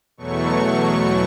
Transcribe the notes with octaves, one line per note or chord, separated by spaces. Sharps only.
E2 B2 F#3 A3 C#6